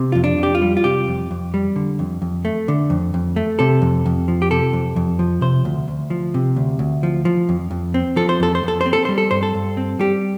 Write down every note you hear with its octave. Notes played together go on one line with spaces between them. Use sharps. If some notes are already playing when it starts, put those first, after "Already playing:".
Already playing: C3
F2 F4
D4
F2 G4
F4
G3
F4
C3 G4
F2
F2
G3
D3
F2
F2
A3
D3
F2
F2
A3
C3 A4
F2
F2
F3
G4
C3 A4
F2
F2
F3
C3 C5
D2
D2
F3
C3
D2
D2
F3
F3
F2
F2
C4
F3 A4
C5
F2 A4
C5
F2 A4
C5
C4
A4
G3 C5
A4
G2 C5
A4
G2
C4
G3 G4